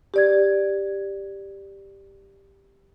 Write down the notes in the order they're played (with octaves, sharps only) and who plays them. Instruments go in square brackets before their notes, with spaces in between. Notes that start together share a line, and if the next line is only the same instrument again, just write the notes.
[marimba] G4 D5 G#6